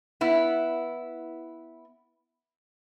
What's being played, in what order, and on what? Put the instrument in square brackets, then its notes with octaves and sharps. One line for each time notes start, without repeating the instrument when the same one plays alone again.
[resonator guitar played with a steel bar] B3 E4